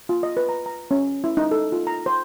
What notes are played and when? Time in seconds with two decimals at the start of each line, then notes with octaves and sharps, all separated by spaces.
0.09 F4
0.23 D#5
0.37 B4
0.49 A#5
0.66 A#5
0.91 C#4
1.24 E4
1.37 D#4
1.51 A4
1.72 F4
1.87 A#5
2.06 C5